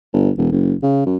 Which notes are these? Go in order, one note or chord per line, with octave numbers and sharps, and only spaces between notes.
G1
E1
F#1
C#3
F#2